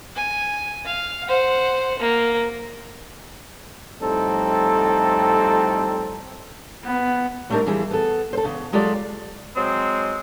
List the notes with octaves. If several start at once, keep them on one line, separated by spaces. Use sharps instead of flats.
G#5
F5
C5 F#5
A#3
F2 A2 G3 C4 D#4 A4
B3
G3 A3 C4 D4 D#4 A#4
E3 F3 G3 E4 G#4
B3 A4
A4 C5
E2 C#3
F#3 G#3 F4 G4 A4 D5
F#3 G#3 C4